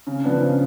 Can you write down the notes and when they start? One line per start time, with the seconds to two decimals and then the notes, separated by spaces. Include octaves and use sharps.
0.07 C#3
0.24 F3 B3 D4
0.41 C#3